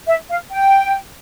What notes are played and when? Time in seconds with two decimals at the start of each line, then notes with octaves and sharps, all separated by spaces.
0.08 E5
0.30 F5
0.51 G5